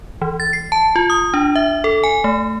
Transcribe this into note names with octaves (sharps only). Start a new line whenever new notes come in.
E3
A6
C7
A5
F4
D#6
D4
E5
A4
G#5
A3